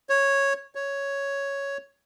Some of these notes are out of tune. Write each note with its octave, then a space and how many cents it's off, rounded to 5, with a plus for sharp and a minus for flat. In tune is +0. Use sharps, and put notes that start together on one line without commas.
C#5 -5
C#5 +5